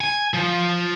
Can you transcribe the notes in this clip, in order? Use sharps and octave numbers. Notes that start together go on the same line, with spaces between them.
G#5
F3